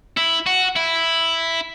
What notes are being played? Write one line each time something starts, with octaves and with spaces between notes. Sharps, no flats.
E4
F#4
E4